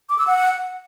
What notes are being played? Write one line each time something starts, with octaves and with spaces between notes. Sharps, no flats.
D6
E6
F#5